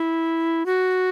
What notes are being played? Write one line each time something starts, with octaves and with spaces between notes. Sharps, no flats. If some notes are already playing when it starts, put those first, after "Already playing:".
Already playing: E4
F#4